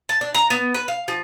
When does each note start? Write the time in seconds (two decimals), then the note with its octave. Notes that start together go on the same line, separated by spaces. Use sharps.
0.09 A5
0.21 D4
0.34 A#5
0.50 B3
0.74 B4
0.88 F5
1.08 F3